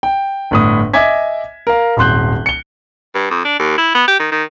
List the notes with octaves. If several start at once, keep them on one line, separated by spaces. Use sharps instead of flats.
G5
G1 A2 D#6
D#5 E5 G#5 D6 G#6 B6
A#4 F5
D#1 G#1 C6 F#6 G6
C#7 G7
G2
F2
D4
D#2
E4
B3
G4
D#3
D#3